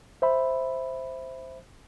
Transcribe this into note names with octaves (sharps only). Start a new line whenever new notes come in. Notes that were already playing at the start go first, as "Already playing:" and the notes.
C5 E5 B5